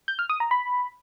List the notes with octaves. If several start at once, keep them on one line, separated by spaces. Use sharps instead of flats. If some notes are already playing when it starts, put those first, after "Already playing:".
G6
F6
D#6
A#5
B5